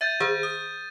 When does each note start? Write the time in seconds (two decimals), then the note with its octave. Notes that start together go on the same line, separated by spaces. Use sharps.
0.01 E5 G6 A6 D#7
0.20 D#3 G#4 C5
0.43 D#6